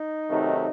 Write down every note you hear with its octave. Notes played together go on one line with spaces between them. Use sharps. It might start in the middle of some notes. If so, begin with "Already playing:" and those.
Already playing: D#4
C3 D#3 F#3 A3